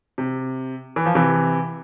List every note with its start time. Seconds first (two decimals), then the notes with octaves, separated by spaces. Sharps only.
0.18 C3
0.96 E3
1.06 F3
1.15 C3 E3